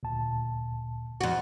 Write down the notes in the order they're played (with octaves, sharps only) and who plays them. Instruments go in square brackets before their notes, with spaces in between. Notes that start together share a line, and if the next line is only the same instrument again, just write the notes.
[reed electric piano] D2 A#2 A5
[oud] F2 F#4